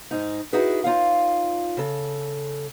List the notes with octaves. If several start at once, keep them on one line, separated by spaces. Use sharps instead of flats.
G#2 D#4
D#4 E4 F#4 G#4 B4
D#4 F4 C#5 F5
C#3 A4